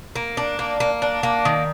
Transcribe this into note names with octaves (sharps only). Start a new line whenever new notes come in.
A#3
D4
A#3
A#3
D4
A#3
D#3